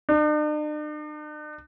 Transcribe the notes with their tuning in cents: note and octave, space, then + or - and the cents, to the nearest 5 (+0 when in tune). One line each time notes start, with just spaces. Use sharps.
D4 +45